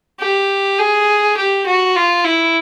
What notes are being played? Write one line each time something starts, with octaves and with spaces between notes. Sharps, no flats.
G4
G#4
G4
F#4
F4
E4